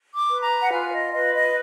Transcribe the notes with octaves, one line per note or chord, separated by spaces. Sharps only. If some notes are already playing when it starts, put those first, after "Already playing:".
D6
B4
A#5
F#5
F4 G#5
D#5
B4 D#5
D#5